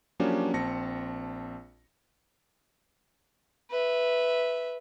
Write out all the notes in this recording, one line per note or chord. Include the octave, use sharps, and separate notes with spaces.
F3 F#3 A#3 C#4 D4 G4
A#1 C4 A5 A#6 C#7
B4 E5